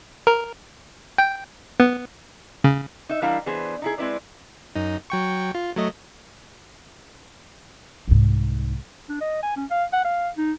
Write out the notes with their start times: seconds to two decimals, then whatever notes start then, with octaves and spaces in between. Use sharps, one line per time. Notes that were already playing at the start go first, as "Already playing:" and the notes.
0.27 A#4
1.18 G5
1.80 B3
2.64 C#3
3.09 D#4 E5
3.22 E3 G3 D4 E4 A#4 F5
3.46 E3 B3 D4 G#4 B4 C5
3.82 D#4 E4 G#4
3.98 G#3 C4 E4 B4 D5
4.76 F#2 D#4
5.10 F#3 G5 C#6
5.55 F4
5.76 F#3 A3 D#5
8.08 C2 G#2
9.09 D4
9.21 D#5
9.43 G#5
9.57 C#4
9.71 F5
9.93 F#5
10.05 F5
10.38 D#4